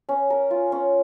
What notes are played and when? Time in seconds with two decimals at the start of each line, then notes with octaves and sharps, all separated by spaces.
0.09 C#4
0.30 A#4
0.51 F4
0.72 C#4